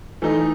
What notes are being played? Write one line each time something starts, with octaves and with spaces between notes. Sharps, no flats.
E3 A3 D#4